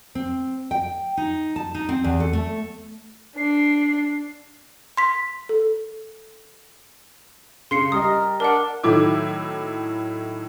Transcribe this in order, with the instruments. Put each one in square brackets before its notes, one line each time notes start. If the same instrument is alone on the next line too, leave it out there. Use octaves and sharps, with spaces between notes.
[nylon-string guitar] C4
G5
D#4
A5
D#4
C4
E2
A4
A3
[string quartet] D4 [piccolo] C7
[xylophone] C6 B6
A4
[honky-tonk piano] C#3 [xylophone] C6 C7 C#7
[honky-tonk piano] G3 D#5 [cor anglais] A#4 [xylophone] D#6
[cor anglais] D4 [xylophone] A#4 F#5
[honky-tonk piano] A2 D#3 F#3 A3 E4 D6